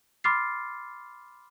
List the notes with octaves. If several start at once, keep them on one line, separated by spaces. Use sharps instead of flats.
B5 C6 D6 F6 A6 C7